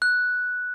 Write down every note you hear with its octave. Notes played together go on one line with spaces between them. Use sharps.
F#6